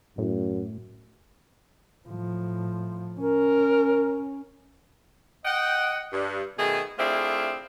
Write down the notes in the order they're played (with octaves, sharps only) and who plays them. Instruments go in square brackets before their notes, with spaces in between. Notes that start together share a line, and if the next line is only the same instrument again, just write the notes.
[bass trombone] F#2 [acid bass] A2
[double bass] A2 F3
[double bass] C#4 [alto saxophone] A#4
[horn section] D#5 F#5 G5
G2
B2 D#3 A3 G#4
A3 C4 D4 E4 F4 G#4